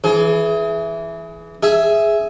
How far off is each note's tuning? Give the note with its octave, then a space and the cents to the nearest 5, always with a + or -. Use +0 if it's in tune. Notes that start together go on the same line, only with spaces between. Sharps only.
E3 +0 G#4 +25
G#4 +5 E5 +0